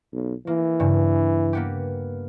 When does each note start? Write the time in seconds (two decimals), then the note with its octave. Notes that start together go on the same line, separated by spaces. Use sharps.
0.13 B1
0.47 E3 A#3
0.80 G2 C#3
1.53 A#3 B3 G4